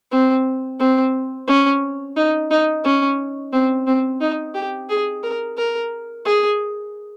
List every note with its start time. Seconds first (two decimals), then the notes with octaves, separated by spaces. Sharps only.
0.11 C4
0.80 C4
1.48 C#4
2.17 D#4
2.51 D#4
2.84 C#4
3.53 C4
3.87 C4
4.21 D#4
4.54 G4
4.89 G#4
5.23 A#4
5.57 A#4
6.25 G#4